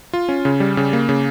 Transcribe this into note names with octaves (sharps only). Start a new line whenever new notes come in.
F4
C#4
C#3
G3
C#3
A#3
C#3